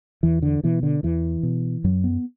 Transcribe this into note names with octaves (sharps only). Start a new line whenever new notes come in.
E2 E3
D3
B2 E3
D3
E2 E3
B2
F#2 F#3
B3